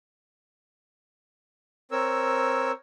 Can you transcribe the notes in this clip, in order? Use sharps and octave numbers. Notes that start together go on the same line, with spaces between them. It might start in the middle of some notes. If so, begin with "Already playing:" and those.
C4 A#4 C#5 E6